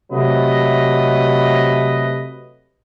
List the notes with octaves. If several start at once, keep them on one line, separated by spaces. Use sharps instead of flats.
C3 F#3 A3 B4 D#5